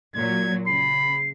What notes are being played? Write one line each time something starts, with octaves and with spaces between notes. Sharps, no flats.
A#2 F#3 G#6
C#3 B5 C7